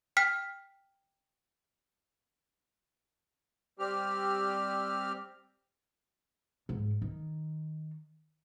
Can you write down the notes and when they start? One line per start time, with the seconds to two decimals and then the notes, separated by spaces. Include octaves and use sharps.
0.17 G5 F6 B6
3.79 G3 C4 G4 F6
6.69 G#2
7.02 D#3